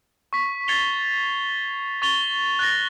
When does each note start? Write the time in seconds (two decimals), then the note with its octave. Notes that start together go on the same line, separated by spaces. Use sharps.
0.33 C#6 B6
0.68 G#6 A6 C7 C#7 F7 G7
2.02 C#6 A6 F7 G7
2.59 F#6 A6 A#6